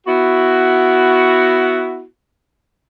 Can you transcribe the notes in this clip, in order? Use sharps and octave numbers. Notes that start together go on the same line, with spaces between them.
B3 E4 F#4